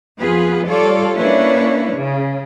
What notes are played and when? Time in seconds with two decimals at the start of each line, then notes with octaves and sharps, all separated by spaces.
0.20 F2 B3 F4 G#4 B4
0.69 G3 F4 A4 C#5 D5
1.17 A#3 C#4 D4 E4 B4 C#5
1.95 C#3